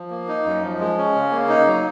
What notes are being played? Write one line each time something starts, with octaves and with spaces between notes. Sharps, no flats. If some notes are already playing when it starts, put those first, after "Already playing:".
Already playing: F3
A#3
D#4
F#2
F3
G#3
C#4
C#3
A#3
D#4
F#3